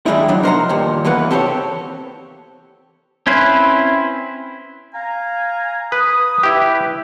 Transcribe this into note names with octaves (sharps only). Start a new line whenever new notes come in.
D#3 G3 G#3 D#4 E4
F3 F#3 D4
D#4 A#4 C5 F5 F#5 A#5
G2 A#2 D#3
E2 E3 A#3 B4 F#5
C4 G4 A4 C5 C#5
C4 C#4 E4 B4 C5
F5 G#5 A#5
B4 D#6
E4 G4 B4